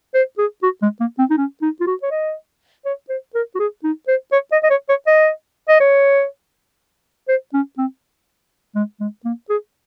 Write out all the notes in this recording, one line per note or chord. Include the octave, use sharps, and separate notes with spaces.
C5
G#4
F#4
G#3
A#3
C4
D#4
C#4
D#4
F4
F#4
C#5
D#5
C#5
C5
A#4
F#4
G#4
D#4
C5
C#5
D#5
D#5
C#5
C#5
D#5
D#5
C#5
C5
C#4
C4
G#3
G#3
A#3
G#4